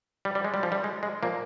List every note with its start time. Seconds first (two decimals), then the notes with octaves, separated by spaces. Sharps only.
0.25 G3
0.35 G3
0.45 G#3
0.54 G3
0.63 F3
0.72 G3
0.84 G#3
1.03 G#3
1.23 A#2 F3 A#3